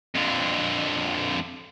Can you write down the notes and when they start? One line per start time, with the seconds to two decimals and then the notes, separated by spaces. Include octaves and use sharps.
0.15 F2 D3